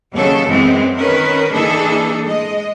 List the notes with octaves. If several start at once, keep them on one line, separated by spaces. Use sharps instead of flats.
D#2 C#3 F#3 A4
F#2 E3 G#3 B3 C4
D#3 C#4 A#4 B4
E3 A#3 D4 D#4 G#4 A4
G#3 D#5